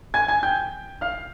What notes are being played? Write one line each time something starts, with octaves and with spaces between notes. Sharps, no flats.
G#5 G#6
G#5 G#6
G5 G6
F5 F6